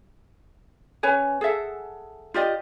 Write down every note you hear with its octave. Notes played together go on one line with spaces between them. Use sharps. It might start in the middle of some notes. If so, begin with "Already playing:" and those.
C#4 B4 C#5 G#5
G#4 A4 E5 F#5
F4 G4 D5 D#5